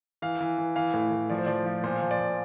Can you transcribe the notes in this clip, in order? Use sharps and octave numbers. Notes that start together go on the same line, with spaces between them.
E3 F5
E3
E3
E3 F5
A2
A2
F3 D5
C5
F3 D5
F3
A#2 C5
F3
D5
A#2